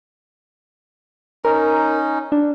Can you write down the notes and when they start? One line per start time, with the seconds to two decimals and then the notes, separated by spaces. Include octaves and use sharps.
1.45 C#4 D#4 A#4
2.32 D4